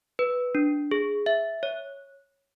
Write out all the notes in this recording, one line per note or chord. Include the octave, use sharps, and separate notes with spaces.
B4
D4
G#4
E5
C#5